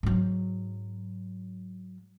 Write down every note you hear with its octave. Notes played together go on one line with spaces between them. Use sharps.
G#2 F#3